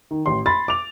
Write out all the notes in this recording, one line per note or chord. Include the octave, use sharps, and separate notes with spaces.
D#3
A1 C6
B5 C6 A6
D6 F7